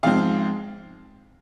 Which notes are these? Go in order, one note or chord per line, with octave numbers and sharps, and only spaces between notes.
G#2 F3 G#3 C4 F5